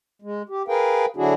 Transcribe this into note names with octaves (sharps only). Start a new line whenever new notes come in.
G#3
G4
G#4 A#4 B4 F5 G5
D3 F#3 D4 E4 F#4 G#4